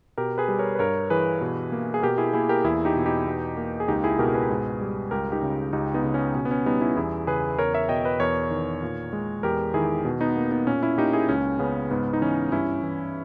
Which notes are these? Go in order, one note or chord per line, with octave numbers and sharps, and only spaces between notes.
B2 G4 A#4
G#4 B4
G3
A#4 C#5
B4
G2 A#4 C#5
E3 G#4 B4
B2
A#3
G#4
B2 G4 A#4
E4 G#4
A#3 E4 G#4
G4 A#4
E2 E4 G#4
D#4 G4
B2
D#4 G4
B2
A#3
G#4
C#2 D#4 G4
E4 G#4
B2 G4 A#4
G#4 B4
G#2
G3
C#2 G4 A#4
D#4 G4
C#3
C#2 D#4 G4
B3 D#4
C#3
C#4
B2 C#4
B3
C#4
G3 B3 D#4
C#4 E4
E2 E4 G#4
C#3 G#4 B4
E2 A#4 C#5
C#5 E5
B2 D#5 G5
B4 D#5
E2 A#4 C#5
D#3
A#2
G#3
E2 G4 A#4
D#3 E4 G#4
B2
B3 D#4
A#3
B3 D#4
A#2 C#4
C#4 E4
A#3 D#4 G4
E4 G#4
C#2 C#4
C#3 B3
G#2 B3
D#4
E3 C#4
G2 C#4 E4
E3